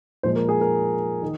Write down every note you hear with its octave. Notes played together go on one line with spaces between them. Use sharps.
A#2 F3 G#3 C5
A#4
G#4
A#4
D#3